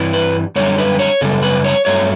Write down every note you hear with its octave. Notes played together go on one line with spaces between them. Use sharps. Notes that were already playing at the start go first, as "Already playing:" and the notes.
Already playing: G2 E3 G3
B4
F#2 D3 G3 C#5
B4
C#5
F#2 C#3 G3 A4
B4
C#5
G2 F#3 A3 C#5